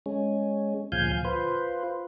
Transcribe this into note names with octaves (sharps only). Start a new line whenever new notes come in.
G#3 C#4
D2 A#2 F3 F5 G#5 G6
F4 B4 C5